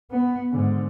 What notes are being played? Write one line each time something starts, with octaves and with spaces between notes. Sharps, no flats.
B3
G#2 D3